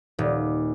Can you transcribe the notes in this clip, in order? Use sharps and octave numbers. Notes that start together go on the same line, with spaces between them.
D#1